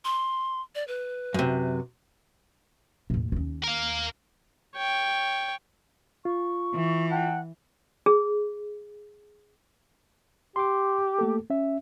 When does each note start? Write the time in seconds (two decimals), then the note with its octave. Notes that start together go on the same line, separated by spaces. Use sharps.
0.05 C6
0.75 D5
0.88 B4
1.34 F#2 C3
3.10 D#2 A2
3.32 D#2 C#4
3.64 A#4 F5
4.76 C#5 G5
6.25 F4 C#6
6.74 E3
7.10 F#5 G5 A5
8.06 G#4
10.56 G4 C6 D6
11.19 A3 A#3 A4
11.50 C#4 E5